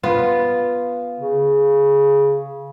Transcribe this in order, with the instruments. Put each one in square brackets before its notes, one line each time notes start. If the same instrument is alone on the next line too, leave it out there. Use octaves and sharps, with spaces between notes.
[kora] B3 F4
[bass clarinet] C#3